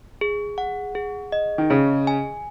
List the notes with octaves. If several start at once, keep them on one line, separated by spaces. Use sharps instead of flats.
G#4
F#5
G#4
D#5
D#3
C#3 G#4
G#5